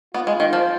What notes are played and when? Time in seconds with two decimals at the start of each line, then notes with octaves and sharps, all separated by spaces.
0.14 B3 F4
0.27 G#3
0.40 D#3
0.53 F3